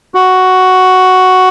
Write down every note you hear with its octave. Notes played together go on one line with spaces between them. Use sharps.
F#4